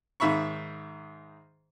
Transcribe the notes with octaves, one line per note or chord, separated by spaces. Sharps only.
G#2 D#3 E5 B5 C#6